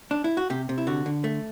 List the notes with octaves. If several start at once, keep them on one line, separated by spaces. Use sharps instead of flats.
D4
E4
F#4
C3 G4
C3
E4
D3 F#4
D3
A3